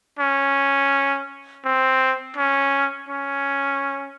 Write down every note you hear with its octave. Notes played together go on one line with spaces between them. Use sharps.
C#4
C4
C#4
C#4